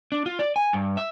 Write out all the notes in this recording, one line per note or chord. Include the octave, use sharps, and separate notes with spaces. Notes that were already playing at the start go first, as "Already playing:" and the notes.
D4
F4
D5
G#5
G2
E5